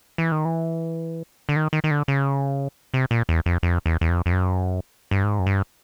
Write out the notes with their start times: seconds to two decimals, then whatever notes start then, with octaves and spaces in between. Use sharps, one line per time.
0.18 E3
0.32 D#3
0.45 E3
1.49 D3
1.56 D#3
1.73 D#3
1.84 D#3
1.91 D3
2.08 C#3
2.94 C3
3.11 A#2
3.29 E2
3.46 F2
3.63 F2
3.86 E2
4.01 E2
4.09 F2
4.26 F2
4.32 F#2
5.11 G2
5.24 G#2
5.39 F#2
5.46 G2